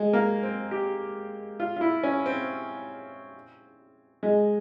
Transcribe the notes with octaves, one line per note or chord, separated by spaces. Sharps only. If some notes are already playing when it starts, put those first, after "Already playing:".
Already playing: G#3
A#3
C4
G4
F4
F4
E4
C#4
C4
G#3